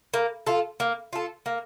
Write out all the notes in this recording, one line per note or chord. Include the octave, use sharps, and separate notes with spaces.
A#3
F4 A4
A#3
F4 A4
A#3